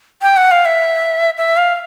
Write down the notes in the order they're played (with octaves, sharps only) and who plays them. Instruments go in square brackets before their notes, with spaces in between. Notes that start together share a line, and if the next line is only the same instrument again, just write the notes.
[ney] G5
F#5
F5
E5
E5
F5